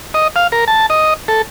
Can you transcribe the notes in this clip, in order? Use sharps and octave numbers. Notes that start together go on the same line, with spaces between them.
D#5
F5
A#4
A5
D#5
A4